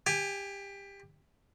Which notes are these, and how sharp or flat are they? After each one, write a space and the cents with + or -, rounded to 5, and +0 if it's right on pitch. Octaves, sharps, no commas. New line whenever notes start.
G4 +20 G#5 +0